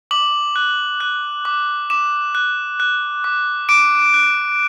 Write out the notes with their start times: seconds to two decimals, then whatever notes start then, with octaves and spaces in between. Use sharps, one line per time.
0.11 D6 F#7
0.56 F#6
1.00 F#6
1.45 D6
1.90 D6 E7
2.35 F#6
2.80 F#6
3.24 D6
3.69 D6 D7
4.14 F#6